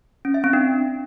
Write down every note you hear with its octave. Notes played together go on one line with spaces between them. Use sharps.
C#4
E5
C4
D4